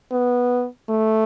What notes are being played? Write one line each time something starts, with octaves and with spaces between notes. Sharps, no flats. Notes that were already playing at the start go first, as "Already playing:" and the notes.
B3
A3